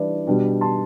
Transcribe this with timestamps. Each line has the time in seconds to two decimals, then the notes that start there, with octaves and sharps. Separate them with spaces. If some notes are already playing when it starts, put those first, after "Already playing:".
Already playing: E3 G3 D4 B4 D5
0.27 B2 G3 D4
0.61 A5 C6